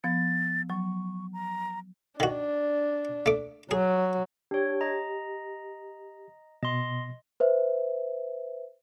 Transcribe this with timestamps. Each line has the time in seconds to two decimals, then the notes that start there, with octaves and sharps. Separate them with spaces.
0.04 F3 B3 A6
0.70 F#3 C#6
1.33 A#5
2.20 D#3 D4 F#4
3.26 A3 D6
3.71 F#3 G#4
4.51 D4 G4 C#5
4.81 D#5 A#5
6.63 B2 D#5 C6
7.40 B4 C5 E5